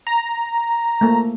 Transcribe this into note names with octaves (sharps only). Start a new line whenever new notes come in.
A#5
A3 A#3